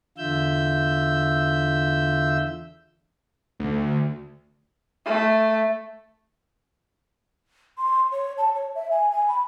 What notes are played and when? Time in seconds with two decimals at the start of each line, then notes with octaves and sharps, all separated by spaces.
0.18 E2 D3 F4 E5 E6 G6
3.60 D2
5.05 A3
7.78 C6
8.12 C#5
8.38 A5
8.55 C#5
8.75 E5
8.91 G#5
9.11 G#5
9.28 B5